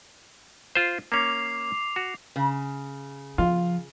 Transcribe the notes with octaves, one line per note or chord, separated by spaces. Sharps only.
F4 C5
A#3 C#4 D6 C7 F7
F#4
C#3
F3 F4